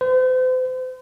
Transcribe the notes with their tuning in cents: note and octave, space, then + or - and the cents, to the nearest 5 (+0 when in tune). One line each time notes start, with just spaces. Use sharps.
C5 -40